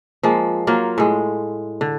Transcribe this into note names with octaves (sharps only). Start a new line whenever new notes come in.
F3 G#3 A#3
F#3 A#3 F4
A2 G#3
D3